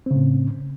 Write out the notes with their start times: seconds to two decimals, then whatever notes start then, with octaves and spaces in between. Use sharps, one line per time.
0.06 C4
0.11 C#3
0.15 A2